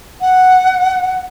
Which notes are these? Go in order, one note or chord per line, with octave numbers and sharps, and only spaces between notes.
F#5